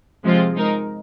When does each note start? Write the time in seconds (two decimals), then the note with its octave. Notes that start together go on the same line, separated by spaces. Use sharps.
0.24 C3 F3 G#3 C4 F4
0.54 G#3 D#4 A#4